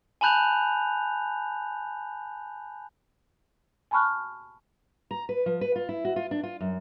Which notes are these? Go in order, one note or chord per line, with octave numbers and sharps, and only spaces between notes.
G#5 A5 B5 F#6 G6 F7
G#5 A5 B5 C#6 F6 F#6
A#5
B4
F3
B4
F4
E4
F#4
F4
D4
F4
F#2